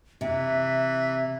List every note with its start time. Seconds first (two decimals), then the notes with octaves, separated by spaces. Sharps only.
0.21 C3 E3 E5